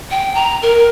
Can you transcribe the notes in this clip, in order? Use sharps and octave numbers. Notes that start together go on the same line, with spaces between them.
G5
A#5
A#4